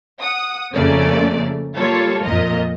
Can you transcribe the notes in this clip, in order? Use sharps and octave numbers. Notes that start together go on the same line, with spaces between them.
F#5 D#6
F2 C#3 A3 A#3 C#4 D5
G3 A#3 F4 A4 C#5
F2 A#2 A#4 D#5